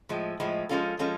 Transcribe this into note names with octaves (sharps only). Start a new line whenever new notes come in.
A2 F3 G#3
A2 F3 G#3
F3 G#3 C#4 F4 A4
F3 G#3 C#4 F4 A4